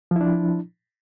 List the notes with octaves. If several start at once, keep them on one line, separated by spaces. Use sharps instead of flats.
F3 D4 E4